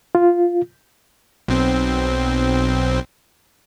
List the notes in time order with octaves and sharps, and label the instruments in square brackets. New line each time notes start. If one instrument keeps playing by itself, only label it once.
[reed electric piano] F4
[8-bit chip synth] B1 C4